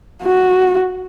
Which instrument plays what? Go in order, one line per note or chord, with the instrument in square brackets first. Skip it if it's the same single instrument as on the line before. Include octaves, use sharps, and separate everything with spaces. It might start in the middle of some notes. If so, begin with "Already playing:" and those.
[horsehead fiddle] F#4